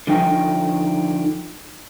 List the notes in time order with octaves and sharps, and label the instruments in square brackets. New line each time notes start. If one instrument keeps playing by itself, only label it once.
[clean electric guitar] D3 F3 D#4 G5